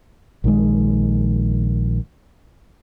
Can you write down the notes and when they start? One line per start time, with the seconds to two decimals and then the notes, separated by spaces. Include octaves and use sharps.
0.44 A#1 D#3 G#3